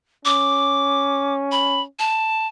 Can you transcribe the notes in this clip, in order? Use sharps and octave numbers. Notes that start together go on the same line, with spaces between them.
C#4 D6
B5
A5